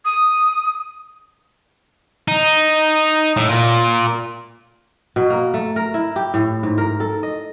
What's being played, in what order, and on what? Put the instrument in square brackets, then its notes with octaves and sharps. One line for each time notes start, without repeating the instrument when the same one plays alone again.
[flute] D#6
[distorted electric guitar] D#4
A2
A#2
[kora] B2
A#3
A3
A#4
E4
G4
A2
G#2
A#4
A4
D#5